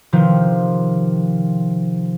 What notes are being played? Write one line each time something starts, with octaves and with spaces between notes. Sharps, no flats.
C3 D#3 F3